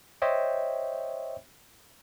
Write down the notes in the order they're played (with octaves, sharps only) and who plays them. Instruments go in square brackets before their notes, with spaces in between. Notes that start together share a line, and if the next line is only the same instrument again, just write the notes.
[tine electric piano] C5 C#5 D#5 E5 G5